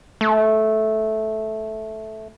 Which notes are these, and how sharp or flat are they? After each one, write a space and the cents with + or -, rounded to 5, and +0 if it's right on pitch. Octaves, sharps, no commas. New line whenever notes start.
A3 -10